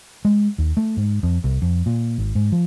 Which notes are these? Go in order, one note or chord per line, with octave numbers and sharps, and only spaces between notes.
G#3
D#2
A3
G#2
F2
C2
F2
A#2
G#1
G#2
F3